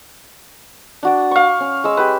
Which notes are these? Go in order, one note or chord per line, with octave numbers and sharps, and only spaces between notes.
D4 F#4 D5
F5 C#6
C#4
G#3 E6
G4 B4